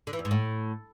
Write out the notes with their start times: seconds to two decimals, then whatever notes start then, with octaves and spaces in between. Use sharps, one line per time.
0.07 D3
0.13 E3
0.19 E2
0.25 G#2
0.31 A2